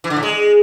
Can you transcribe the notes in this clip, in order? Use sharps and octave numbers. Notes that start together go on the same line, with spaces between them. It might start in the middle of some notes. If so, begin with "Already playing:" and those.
E3
D3
A2
G#3